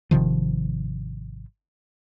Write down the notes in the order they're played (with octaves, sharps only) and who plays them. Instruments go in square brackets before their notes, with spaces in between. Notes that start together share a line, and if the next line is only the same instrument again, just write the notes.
[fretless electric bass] G#1 C3 D#3 F3